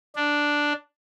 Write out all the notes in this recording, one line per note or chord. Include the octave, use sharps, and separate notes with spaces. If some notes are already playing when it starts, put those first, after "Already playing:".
D4